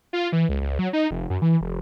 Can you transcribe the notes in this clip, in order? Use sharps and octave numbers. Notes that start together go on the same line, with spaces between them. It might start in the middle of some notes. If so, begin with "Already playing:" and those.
F4
E3
C#2
C#2
F#3
D#4
F1
F#2
E3
F1